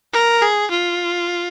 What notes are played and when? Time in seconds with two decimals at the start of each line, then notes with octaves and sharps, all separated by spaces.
0.13 A#4
0.42 G#4
0.71 F4